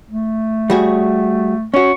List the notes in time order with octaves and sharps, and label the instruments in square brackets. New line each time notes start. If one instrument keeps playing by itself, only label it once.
[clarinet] A3
[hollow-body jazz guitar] G3 F#4 G#4
[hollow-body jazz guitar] C#4 F#4 [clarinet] C#6